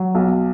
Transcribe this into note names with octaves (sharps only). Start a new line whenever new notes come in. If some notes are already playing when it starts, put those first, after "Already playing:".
Already playing: F#3
B1